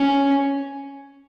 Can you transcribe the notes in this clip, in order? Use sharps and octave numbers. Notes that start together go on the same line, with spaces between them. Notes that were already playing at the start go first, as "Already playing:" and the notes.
Already playing: C#4